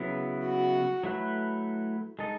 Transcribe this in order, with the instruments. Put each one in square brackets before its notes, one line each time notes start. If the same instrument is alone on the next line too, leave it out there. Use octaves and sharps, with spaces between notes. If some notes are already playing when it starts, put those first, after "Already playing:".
Already playing: [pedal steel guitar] C#3 F#3 B3 E4
[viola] F#4
[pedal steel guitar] F#3 A3 E4 B4
G#3 D#4 A4 D#5